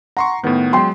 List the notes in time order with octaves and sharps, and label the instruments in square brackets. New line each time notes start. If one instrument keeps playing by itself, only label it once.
[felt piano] F#5 [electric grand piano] A#5 C6 C#6
[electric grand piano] A2 D#3 [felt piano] B3
[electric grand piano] F#3 G#3 [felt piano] G5 C6